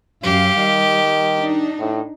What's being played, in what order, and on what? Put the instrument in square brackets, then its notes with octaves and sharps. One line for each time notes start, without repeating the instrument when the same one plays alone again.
[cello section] F#2 F5 [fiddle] G4
[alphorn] D#3 [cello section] G3
[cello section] D4 D#4
[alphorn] A2